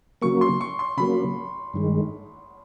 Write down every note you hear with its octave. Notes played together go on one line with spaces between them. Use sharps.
C#3 F#3 A#3 C#6
C6
C#6
C6
C#3 F#3 A#3 B5
G2 D#3 G#3